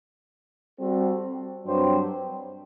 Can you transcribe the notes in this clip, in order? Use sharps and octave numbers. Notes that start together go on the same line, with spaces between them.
G3 C4 F#4 A4
G2 F#3 C4 G4 C5